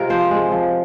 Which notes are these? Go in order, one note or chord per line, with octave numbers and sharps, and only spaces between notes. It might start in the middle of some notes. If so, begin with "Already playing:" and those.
Already playing: C3 G#3 F4 G#4 A#4
F3 C5
G#3
F3